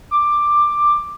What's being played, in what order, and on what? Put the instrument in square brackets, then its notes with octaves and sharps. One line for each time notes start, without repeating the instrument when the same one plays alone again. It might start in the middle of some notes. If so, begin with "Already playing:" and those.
[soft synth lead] D6